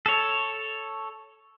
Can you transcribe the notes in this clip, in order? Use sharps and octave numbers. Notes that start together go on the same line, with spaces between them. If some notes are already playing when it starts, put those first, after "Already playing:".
A4 C#5